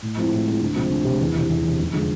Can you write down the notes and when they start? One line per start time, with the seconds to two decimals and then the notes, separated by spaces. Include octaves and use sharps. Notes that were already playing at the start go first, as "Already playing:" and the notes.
0.02 A2
0.17 F3 G#3 C4 E4
0.32 A2
0.47 F3 G#3 C4 E4
0.61 D2
0.76 C3 F3 G#3 C4
0.91 D2
1.05 C3 F3 G#3 C4
1.21 E2
1.35 C3 E3
1.49 E2
1.64 C3 E3
1.79 F1
1.93 D3 F3 G#3